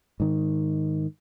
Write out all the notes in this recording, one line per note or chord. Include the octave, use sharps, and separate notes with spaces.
G#2 D#3